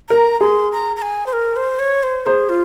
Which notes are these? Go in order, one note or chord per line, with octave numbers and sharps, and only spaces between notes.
A#4 A#5
G#4 C6
A#5
A#5
G#5
C5
A#4
C5
C#5
C5
G#4 C5
F4